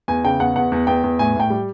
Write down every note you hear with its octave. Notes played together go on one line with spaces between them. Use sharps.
E2 G#5
C#3 G5
E2 F#5
E2 F#5
E2
E2 G5
E2
A2 G#5
A2 G5
G3